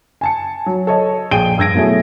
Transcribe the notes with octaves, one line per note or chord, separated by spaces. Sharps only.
G#5 A5 C#7
F#3
A4 C#5 D#5
A#1 G#4 G5 D7 D#7 G7
G2 E6 G#6 A#6 D7
B2 F#3 A3 E4 G#4